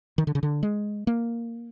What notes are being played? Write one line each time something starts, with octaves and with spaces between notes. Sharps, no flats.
D#3
D3
C#3
D3
G#3
A#3